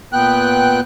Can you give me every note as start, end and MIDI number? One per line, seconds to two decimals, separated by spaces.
0.13 0.80 46
0.13 0.80 59
0.13 0.80 79
0.13 0.80 90